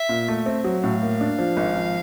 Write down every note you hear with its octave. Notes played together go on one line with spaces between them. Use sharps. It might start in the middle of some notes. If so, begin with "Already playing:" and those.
Already playing: E5
A#2
A3
C4
F#3
A2 F5
A#3
D4
F3
G#1
F3